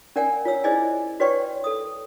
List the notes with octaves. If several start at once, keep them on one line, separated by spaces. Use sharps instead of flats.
C#4 A#4 D5 F#5 G#5
F4 C#5 E6
E4 G#4 C5 D5 D#5 G#5
F#4 B4 C#5 D5 G5 C#6
A4 D#6